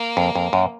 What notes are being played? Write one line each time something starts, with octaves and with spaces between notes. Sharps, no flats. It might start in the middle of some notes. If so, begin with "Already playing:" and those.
Already playing: A#3
F2
F2
F#2